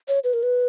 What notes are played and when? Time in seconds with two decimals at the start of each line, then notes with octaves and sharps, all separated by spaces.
0.08 C#5
0.24 B4
0.33 A#4
0.43 B4